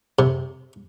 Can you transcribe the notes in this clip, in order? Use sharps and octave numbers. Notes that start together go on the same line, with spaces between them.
C3